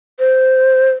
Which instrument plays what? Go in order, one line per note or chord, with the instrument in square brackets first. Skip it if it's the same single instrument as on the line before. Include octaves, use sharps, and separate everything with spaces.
[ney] C5